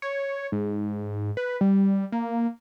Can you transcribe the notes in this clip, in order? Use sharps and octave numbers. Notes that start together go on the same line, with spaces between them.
C#5
G#2
B4
G3
A#3